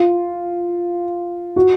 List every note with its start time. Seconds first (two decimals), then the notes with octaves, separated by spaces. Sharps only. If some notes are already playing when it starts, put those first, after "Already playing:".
Already playing: F4
1.56 F#4